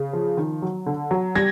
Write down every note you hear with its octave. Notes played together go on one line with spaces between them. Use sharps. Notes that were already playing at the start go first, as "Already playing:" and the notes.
Already playing: C#3
F3
D#3
F#3
D3
F#3
G3 G#6 A#6